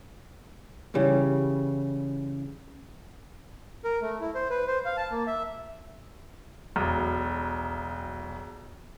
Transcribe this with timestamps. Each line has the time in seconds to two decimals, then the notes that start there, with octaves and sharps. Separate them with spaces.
0.94 C#3 E3 G3 C#4
3.85 A#4
4.02 A3
4.21 E4
4.35 C5
4.50 B4
4.67 C5
4.85 F5
4.97 A5
5.11 A#3
5.27 E5
6.76 E1 B1